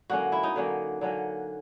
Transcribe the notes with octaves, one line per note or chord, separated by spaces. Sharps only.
D3 F#3 A#3 C#4 F#4
E4
D#4
D3 F#3 A#3 C#4
D3 F#3 A#3 C#4